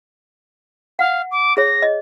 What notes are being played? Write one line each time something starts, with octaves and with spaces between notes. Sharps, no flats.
F5 F#5
D6
G#4 C#5 A#6
D#5